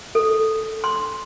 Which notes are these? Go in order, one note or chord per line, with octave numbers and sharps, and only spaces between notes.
A4
C6